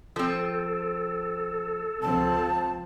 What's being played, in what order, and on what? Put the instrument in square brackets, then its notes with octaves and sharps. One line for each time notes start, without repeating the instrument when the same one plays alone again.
[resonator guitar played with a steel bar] F3 C4 [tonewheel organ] A4
[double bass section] C#2 F3 C4 [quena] A5